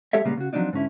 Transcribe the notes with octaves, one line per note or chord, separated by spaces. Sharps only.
G#3 G4 A4 C#5 E5
A#2 C#3 G3 G#3 A#3 B3
C#3 F#4
F3 F#3 A#3 C4 D4 D#4
G#2 D3 C#4 E4